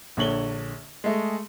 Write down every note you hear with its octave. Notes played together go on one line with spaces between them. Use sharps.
A#1 D3 C#5 F#7 G7
G#3 A3 D#5